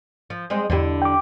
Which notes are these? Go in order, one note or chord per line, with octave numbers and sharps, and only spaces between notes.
F3
G3 G#3 C4
E2 D3 D4 E4 G4
G5 D6